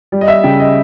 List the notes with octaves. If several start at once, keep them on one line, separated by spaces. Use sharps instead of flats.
G3
D#5
E5
C#3 G5
D#5